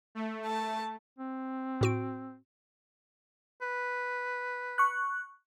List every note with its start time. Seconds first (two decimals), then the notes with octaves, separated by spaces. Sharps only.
0.15 A3
0.46 A5
1.18 C4
1.81 A2 F#4 D7
3.61 B4
4.78 C#6 F#6